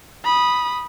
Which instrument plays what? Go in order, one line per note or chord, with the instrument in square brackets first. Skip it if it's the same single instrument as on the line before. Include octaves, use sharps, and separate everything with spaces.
[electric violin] B5 D#6